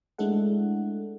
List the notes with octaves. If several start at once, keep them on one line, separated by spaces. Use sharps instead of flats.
G#3 A3 D4 E4 A4 F#5